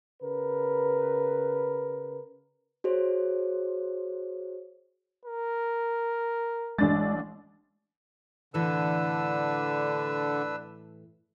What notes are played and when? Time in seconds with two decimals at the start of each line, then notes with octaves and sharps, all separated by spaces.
0.22 C#3 A#4 B4
2.84 F#4 G#4 C5 C#5
5.25 A#4
6.78 A1 G#3 D4 A6
8.54 A2 D3 E3 D4 A4 B4 E6